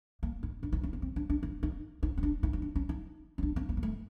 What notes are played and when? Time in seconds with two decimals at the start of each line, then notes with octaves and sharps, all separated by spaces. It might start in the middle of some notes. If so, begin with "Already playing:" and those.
0.23 A#3
0.43 D#4
0.63 D4
0.73 D#4
0.83 C#4
0.93 B3
1.02 C4
1.16 D4
1.30 D4
1.43 D#4
1.63 D#4
2.03 D#4
2.18 C#4
2.23 D4
2.43 D#4
2.53 D#4
2.62 D4
2.76 C#4
2.89 D#4
3.38 C#4
3.43 D4
3.56 C4
3.69 B3
3.77 A#3
3.83 A3